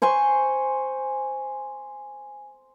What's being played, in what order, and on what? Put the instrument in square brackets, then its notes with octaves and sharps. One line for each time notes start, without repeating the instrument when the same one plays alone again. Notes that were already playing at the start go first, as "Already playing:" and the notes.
[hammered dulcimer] C5 G#5 C6 C#6